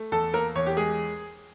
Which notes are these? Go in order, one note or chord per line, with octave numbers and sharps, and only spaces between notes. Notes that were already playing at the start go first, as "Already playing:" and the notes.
Already playing: A3
E2 A4
A#3 A#4
E2 C#5
G4
G#3 G#4